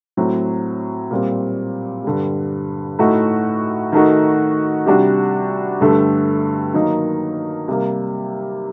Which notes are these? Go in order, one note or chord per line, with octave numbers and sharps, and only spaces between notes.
A2 F#3 C4
A#2 G3 C4
G2 D3 G3
A2 A3 D#4 F#4
D#3 A3 D#4 F#4
C3 G3 D4 F#4
G2 D3 A3
D#3 F#3 A#3 D#4
C3 G3 A#3